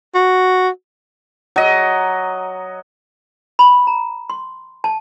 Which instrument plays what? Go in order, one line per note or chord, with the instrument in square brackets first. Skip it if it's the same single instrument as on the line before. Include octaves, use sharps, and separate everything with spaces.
[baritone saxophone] F#4
[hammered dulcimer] F#3 D#5
[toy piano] B5
A#5
C6
A5